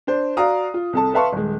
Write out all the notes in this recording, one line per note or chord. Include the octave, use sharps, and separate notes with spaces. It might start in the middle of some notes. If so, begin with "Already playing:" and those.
D4 C5
F#4 D5 F5 A#5 D#6
F4
C2 A4 A5
B4 E5 F5 A5 C6 C#6
D#1 G#3